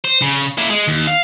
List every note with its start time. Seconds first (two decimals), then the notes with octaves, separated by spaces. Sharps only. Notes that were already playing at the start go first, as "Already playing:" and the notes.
0.05 C5
0.22 C#3
0.57 A#3 E4
0.70 G#3
0.88 D#2
1.07 F5